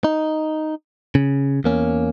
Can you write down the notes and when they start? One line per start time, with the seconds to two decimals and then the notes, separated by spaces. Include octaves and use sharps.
0.04 D#4
1.15 C#3
1.64 E2 A#3 C#4